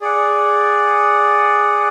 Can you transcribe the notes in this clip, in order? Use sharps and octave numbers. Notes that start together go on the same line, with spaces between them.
G#4 D5 F#5